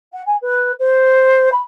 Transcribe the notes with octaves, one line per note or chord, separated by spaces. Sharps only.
F#5
G#5
B4
C5
B5